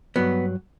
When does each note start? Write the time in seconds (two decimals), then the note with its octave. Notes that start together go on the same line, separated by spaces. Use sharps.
0.16 G2 F#3 B3